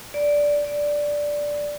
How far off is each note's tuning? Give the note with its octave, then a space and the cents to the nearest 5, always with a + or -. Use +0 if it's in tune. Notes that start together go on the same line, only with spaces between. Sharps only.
D5 -10
D5 -5